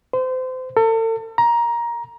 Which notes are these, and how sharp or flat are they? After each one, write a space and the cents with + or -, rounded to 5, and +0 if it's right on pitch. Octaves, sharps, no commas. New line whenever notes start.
C5 -30
A4 +40
A#5 +15